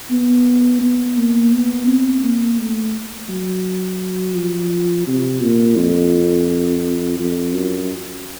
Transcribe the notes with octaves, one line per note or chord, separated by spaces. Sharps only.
B3
B3
A#3
B3
C4
A#3
A3
F#3
F3
C3
A#2
F2
F2
F#2